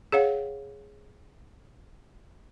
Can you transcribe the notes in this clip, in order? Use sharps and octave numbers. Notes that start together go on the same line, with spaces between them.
G#4 C#5 F5 F#5